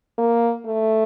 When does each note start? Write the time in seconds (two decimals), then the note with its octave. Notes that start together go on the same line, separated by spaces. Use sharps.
0.18 A#3
0.66 A3